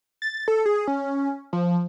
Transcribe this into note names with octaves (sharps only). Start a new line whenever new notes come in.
A6
A4
G#4
C#4
F3